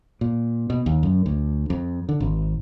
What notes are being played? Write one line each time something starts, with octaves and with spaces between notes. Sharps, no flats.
A#2
B2
D#2
F#2
D2
F2
D3
G#1